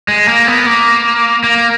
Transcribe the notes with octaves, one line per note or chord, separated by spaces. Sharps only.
G#3
A#3
B3
A#3
A#3